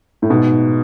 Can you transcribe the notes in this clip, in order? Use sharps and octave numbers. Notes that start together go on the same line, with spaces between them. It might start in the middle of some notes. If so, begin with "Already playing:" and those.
A2
G#2 B2